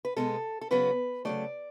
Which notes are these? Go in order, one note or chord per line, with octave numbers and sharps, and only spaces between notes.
B4
B2 G#3 B3 A4
A4
C#3 F#3 B3 B4
C#3 F#3 A3 D5